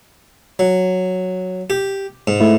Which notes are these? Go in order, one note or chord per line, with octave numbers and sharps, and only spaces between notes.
F#3
G4
G#2
A3 E4